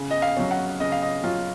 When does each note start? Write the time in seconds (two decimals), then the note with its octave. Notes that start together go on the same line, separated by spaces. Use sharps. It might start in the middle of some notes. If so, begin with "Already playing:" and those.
Already playing: C#3
0.11 D#5
0.22 F5
0.37 F#3 C#4
0.51 F#5
0.80 C#3 D#5
0.92 F5
1.02 D#5
1.24 F#3 C#4 F4